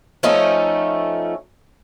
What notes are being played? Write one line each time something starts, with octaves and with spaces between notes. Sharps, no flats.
F3 A3 C#4 D#4